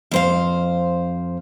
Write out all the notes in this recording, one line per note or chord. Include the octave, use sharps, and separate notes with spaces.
F2 C5 F5